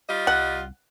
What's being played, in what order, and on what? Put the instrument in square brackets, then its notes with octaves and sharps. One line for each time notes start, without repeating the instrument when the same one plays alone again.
[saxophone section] G3 F4 D#5
[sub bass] C2 [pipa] F#5